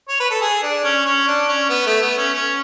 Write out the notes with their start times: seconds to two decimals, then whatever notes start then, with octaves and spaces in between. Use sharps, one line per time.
0.09 C#5
0.20 B4
0.31 A4
0.41 G#4
0.63 D4
0.84 C#4
1.06 C#4
1.27 D4
1.49 C#4
1.69 B3
1.86 A3
2.02 B3
2.18 C#4
2.34 C#4